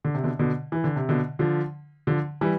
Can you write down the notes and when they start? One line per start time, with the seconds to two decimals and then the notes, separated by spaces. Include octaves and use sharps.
0.04 D3
0.15 C3
0.23 B2 D3
0.39 B2 D3
0.72 E3
0.84 D3
0.96 C3
1.09 B2 D3
1.39 D3 F3
2.07 D3 F3
2.41 E3 G3